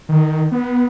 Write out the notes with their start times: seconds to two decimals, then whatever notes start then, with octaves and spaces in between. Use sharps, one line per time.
0.09 D#3
0.52 B3